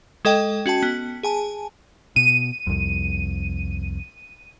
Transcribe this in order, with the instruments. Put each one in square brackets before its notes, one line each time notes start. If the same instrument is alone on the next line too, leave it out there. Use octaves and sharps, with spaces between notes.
[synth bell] G#3 A4 D#5 G5
C#4 F#4 G5 A5
B3
G#4 G#5 A5
[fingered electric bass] B2 [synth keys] D#7
[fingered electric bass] C2 F2